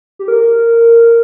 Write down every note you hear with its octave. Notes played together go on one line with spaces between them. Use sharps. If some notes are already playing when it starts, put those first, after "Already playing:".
G4
A#4